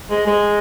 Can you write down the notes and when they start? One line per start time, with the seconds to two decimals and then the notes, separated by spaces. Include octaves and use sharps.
0.10 G#3
0.27 G#3